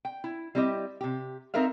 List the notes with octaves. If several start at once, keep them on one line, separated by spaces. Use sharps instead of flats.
G5
E4
G3 C4 E4 G4 D#5
C3 G4
C4 D#4 A4 A#4 E5 F5